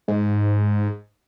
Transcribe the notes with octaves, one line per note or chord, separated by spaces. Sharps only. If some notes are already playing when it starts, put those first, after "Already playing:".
G#2